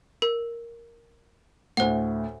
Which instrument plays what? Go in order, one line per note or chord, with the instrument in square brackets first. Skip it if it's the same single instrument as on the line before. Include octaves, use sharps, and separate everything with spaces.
[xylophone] A#4
[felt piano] D2 A2 [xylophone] C5 F#5